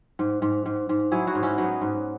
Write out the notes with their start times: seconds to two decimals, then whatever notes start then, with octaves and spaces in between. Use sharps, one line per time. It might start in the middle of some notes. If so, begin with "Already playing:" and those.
0.19 G#2
0.42 G#2
0.66 G#2
0.89 G#2
1.12 F#3 E4 G#4
1.27 D#4 F#4
1.35 G#2
1.43 C#4 E4
1.58 F#3 B3 D#4
1.81 G#2